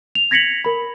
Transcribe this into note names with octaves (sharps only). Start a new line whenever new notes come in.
F7
G#6 A#6 B6 C#7 F7 F#7
A#4 B5